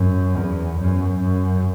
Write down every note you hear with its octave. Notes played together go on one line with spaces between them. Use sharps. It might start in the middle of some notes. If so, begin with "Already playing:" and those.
Already playing: F#2
E2
F#2
F#2